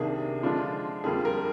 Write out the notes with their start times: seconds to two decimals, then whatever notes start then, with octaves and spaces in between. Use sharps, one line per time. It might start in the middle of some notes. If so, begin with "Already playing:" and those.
Already playing: C2 C3 D#3 A#3 D4 G#4
0.43 D3 F3 G#3 D4 F4
1.04 F2 D3 G3 A#3 F4 G#4
1.25 A#4